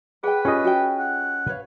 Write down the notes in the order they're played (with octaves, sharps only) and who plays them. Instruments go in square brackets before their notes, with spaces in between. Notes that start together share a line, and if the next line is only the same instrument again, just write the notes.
[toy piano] G#4 [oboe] B4 [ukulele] F#5 G5
[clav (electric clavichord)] C#4 D#5 [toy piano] F4 G4 [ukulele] F#5
[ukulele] F#4 G5
[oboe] F#5
[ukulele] B4 C#5 F5